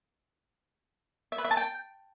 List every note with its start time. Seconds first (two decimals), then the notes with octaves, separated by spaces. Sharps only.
1.32 E5
1.38 B4
1.45 E5
1.51 A5
1.57 G5